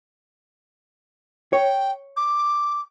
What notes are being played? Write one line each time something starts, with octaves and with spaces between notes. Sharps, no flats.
C#5 G5
D6